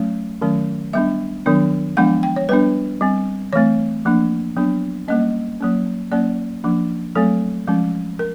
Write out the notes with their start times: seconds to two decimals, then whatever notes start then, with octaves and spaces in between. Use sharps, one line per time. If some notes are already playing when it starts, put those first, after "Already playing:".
Already playing: F#3 A3 C#4
0.41 D#3 F#3 A3 C#4
0.93 G3 B3 D4 E5
1.46 D#3 F#3 B3 D4
1.97 F3 G#3 B3 D4 F#5
2.23 G5
2.36 C#5
2.49 G3 B3 D4 B4
3.01 G3 C4
3.53 E3 A3 C4 C#5
4.05 F3 A#3 D4
4.56 F#3 B3 D4
5.08 G3 A#3 C#4 D#5
5.61 F#3 A#3 C#4
6.12 F#3 A#3 C#4 D5
6.64 F3 A#3 D4
7.15 F#3 A3 C4 A4
7.68 F3 G#3 C#4
8.19 A#4